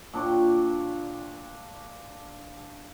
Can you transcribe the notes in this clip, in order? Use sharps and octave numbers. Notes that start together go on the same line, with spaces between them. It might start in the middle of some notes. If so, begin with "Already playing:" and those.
A#2 D4 G5 C#6